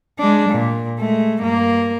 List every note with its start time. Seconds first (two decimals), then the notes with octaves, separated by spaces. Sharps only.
0.19 G#3 D4
0.49 A#2
0.99 G#3 A3
1.42 G2 A#3